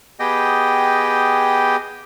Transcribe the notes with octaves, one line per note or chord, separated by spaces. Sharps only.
B3 G4 G#4 D#5 G5